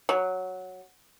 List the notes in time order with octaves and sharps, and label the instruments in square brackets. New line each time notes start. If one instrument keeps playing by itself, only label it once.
[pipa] F#3